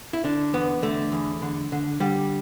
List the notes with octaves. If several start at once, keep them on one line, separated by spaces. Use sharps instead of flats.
E4
D3 D4
E2 B3
D3 A3
E2
D3
D3
D3 G3